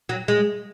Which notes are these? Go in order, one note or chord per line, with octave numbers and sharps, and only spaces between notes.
F#3
G#3